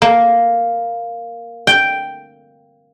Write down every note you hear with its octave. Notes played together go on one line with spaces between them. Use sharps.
A#3
G5